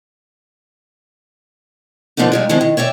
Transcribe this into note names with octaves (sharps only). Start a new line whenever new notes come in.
D3 F3 A#3 B3 D#4
A#2 G3 G#3
D#3 F3 G#3 B3 C4 E4
D#3
C#5 D5 E5 G5